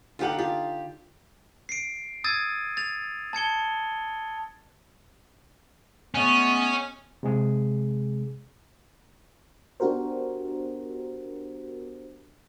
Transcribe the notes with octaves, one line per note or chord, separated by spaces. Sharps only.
D3 D#4 F4 G4 F#5 D6
F4 G4
C7 D7
D#6 E6 G#6 A6 D#7
A6 F7
A5 G#6 C#7 G7
G#3 A3 B3 C#4
C3 G#3 G#4
B3 D4 F#4 G4 A#4 C5